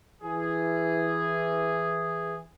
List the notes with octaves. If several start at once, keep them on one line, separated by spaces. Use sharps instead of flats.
E3 G#4